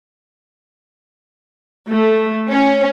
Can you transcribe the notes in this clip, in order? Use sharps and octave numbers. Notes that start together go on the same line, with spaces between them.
A3
C#4